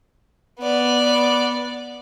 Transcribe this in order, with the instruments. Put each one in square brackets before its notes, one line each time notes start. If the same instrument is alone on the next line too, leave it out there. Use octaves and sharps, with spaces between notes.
[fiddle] B3 D5